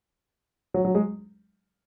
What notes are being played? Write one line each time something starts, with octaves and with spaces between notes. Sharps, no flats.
F#3
F#3
G#3